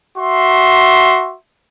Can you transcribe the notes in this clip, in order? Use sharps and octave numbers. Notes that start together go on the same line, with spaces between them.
F#4 E5 C6